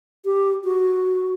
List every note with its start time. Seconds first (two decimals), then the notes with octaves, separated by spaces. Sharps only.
0.25 G4
0.64 F#4